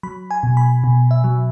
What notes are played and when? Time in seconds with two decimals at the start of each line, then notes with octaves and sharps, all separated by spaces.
0.03 F#3 B5
0.31 G#5
0.43 B2
0.57 B5
0.84 B2
1.11 E5
1.24 F#3